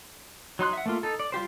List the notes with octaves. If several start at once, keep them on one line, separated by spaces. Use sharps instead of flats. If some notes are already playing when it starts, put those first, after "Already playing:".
F#3 D#4 C6 F#6
E5 F#5
A3 A#3 F4
D#4 A4
D5
G3 F4 G4 C5